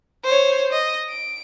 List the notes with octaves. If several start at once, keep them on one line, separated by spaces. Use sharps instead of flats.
C5 C#5
D#5
D7